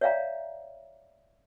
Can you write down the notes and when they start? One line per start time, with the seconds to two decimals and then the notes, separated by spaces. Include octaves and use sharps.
0.01 C#5 D5 E5 F5 G5 A#5